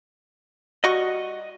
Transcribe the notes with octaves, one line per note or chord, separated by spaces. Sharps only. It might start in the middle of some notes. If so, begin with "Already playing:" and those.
G3 F#4 D#5 C#6